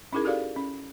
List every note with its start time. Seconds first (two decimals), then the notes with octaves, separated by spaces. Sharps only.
0.13 C#4 D#4 E4 G#4 A#4
0.24 F#4 G4 A4 A#4 D5 F5
0.56 C#4